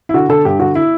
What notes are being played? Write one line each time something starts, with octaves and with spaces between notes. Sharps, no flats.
E4
D3 F#4
D3 A4
G2 G4
D3 F#4
E4